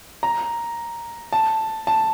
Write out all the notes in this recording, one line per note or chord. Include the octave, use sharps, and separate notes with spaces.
A#5
A5
A5